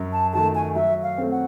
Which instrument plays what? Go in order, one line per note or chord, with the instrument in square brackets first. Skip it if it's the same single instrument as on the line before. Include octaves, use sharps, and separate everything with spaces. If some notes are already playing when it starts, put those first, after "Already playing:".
Already playing: [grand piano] F#2
[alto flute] A5
[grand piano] D#3 F#3 A3 [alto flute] A5
[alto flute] G#5
[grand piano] F#3 [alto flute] E5
[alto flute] F5
[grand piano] A3 C4
[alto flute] F#5